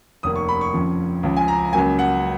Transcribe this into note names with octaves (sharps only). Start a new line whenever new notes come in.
F1 D#2 D#3 D#6
C#6
B5
C#6
F2 C#3 F3
C#2 C#3 F3
G#5
A#5
C#2 C#3 F#3 A#3 G#5
F#5